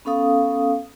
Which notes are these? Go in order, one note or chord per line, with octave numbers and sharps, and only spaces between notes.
B3 C#4 A4 F5 D#6